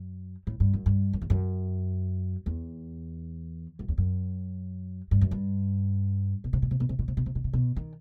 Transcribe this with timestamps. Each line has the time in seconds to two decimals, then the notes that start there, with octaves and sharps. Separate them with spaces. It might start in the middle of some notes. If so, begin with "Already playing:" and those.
Already playing: F#2
0.47 A2
0.60 G2
0.73 F#2
0.86 G2
1.13 F#2
1.22 E2
1.30 F#2
2.46 E2
3.79 F#2
3.88 E2
3.98 F#2
5.11 G2
5.21 F#2
5.31 G2
6.44 B2
6.53 C3
6.62 B2
6.71 C3
6.80 B2
6.89 C3
6.99 B2
7.08 C3
7.17 B2
7.26 C3
7.35 B2
7.44 C3
7.53 B2
7.76 D#3